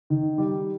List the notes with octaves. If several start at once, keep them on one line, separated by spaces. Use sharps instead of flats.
D#3
G3